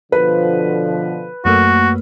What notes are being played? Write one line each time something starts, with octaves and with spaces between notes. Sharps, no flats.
B2 D3 F3 B4
F#2 A3 A#3 F#4